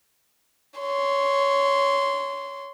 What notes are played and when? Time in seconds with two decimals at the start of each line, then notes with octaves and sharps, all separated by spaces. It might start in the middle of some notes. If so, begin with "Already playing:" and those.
0.80 C#5 C6